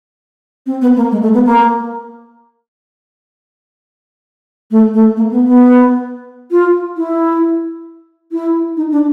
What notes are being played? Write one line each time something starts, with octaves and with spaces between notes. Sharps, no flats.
C4
B3
A#3
G#3
A3
B3
A#3
A3
A3
A#3
B3
B3
F4
E4
E4
D#4
D4